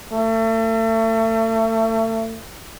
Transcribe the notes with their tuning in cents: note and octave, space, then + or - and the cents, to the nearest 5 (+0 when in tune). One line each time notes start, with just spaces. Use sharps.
A3 +35